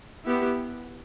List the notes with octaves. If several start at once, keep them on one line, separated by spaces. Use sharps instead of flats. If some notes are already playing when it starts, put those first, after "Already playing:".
B3 E4 G4